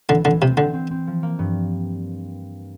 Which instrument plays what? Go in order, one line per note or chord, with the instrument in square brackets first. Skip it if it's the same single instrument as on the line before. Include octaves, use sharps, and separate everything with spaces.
[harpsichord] D3 [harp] E3
[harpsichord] D3 [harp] E3
[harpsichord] C3 [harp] C4
[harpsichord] D3 [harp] C4
[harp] C4
C4
F3
A#3
G2